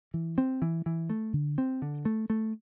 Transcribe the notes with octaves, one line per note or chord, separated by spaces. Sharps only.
E3
C4
E3
E3
A3
D3
C4
D3
A3
A3